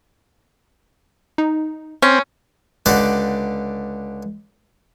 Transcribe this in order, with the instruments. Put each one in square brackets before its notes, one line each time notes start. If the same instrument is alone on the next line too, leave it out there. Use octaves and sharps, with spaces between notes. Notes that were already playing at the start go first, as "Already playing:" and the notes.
[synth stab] D#4
[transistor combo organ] C4 [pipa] C#4
[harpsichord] C#2 D3 G4 D5 F#5